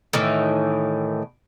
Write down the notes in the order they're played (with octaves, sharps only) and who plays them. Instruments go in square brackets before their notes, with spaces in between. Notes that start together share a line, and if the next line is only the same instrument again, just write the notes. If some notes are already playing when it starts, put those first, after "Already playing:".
[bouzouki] A2 D#3 E3